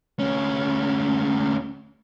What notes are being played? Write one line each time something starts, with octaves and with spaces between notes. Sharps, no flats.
D2 C#4